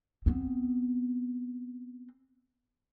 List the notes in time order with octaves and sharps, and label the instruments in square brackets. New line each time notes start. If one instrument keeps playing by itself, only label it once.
[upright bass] B3 C4